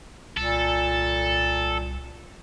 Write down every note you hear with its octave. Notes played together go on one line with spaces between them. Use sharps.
C2 A#2 A4